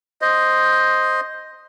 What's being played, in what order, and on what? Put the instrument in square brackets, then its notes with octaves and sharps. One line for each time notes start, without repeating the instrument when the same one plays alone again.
[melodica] C5 D#5